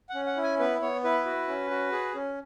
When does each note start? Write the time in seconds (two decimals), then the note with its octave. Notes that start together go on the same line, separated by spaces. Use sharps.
0.09 F#5
0.15 C#4
0.26 F#5
0.37 E4
0.43 G#5
0.59 B3 B4
0.81 B3 C#5
1.04 E4 B4
1.26 F#4
1.48 C#4
1.71 F#4
1.92 G#4
2.15 C#4